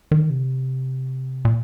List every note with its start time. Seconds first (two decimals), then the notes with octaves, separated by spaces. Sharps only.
0.11 D#3
0.30 C3
1.45 A#2